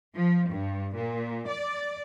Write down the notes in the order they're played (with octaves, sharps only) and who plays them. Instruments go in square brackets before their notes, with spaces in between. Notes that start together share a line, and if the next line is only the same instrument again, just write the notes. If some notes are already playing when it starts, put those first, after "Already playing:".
[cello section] F3
G2
A#2
D5